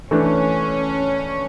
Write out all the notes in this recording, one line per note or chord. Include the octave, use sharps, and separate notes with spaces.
E3 A3 C#4 D4